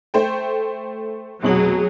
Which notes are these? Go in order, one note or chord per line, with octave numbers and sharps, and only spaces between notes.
A3 C5 G5
F1 B2 F#3 G#4 F#7